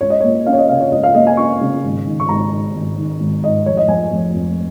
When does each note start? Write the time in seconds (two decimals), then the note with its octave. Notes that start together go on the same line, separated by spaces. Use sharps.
0.01 C#2 C#5
0.10 D#5
0.20 A#3 C#5
0.46 C#4 F5
0.53 C#5
0.58 D#5
0.69 C#3 F5
0.80 C#5
0.92 C#2 D#5
1.03 F5
1.15 A#3 D#5
1.27 G#5
1.37 C#4 C#6
1.61 C#3
1.84 G#1
2.07 D#3
2.20 C#6
2.29 G#1 A#5
2.52 G#2
2.75 G#1
2.98 D#3
3.20 G#1
3.43 G#2 D#5
3.65 F1 C#5
3.77 D#5
3.88 F3 G#5
4.11 F1
4.34 F2